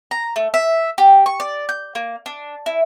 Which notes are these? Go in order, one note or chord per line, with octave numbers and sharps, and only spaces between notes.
A#5
A3
E5
G4
C#6
D5
G6
A#3
D4
E4